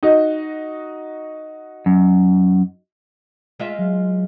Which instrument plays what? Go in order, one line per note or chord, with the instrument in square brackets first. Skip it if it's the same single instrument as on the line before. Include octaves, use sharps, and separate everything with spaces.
[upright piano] D#4 F#4 D#5
[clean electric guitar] F#2
[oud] G#3 F4 E5
[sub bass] F#3